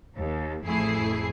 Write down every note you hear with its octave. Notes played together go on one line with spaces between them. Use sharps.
D#2
A1 F2 A3 E4 G#4 C7